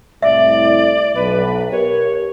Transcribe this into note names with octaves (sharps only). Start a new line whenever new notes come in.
C2 A2 D5 E5
B1 B4
G4 A#4 C#5